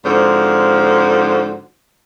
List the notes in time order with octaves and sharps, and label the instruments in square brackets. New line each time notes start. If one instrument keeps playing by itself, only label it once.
[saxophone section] G#2 D3 F3 C4 F#4